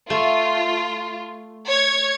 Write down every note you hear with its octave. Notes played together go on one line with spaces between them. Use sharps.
A3 F4
C#5 G#6